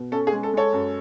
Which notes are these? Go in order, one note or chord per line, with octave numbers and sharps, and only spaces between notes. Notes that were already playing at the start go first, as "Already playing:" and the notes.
Already playing: B2
C#4 A4
G#4
G#3
A4
G#3 A4 C#5
F#2